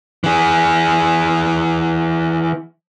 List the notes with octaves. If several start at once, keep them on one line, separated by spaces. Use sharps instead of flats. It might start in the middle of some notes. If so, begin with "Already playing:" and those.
E3 G#4